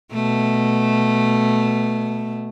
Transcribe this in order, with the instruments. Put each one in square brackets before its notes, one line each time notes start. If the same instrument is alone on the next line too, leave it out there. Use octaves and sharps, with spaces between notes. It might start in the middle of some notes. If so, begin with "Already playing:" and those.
[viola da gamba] B2 A3